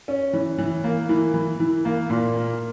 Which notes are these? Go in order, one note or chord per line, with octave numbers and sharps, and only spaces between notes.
C#4
E3
E3
A#3
E3
E3
E3
A#3
A#2
A#3